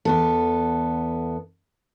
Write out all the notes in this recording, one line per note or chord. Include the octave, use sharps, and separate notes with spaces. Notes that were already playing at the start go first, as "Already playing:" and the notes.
E2 B3 A4